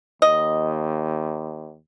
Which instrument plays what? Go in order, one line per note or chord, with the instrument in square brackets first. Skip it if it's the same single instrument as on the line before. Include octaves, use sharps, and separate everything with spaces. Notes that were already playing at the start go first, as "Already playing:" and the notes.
[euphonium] D#2 [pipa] D#5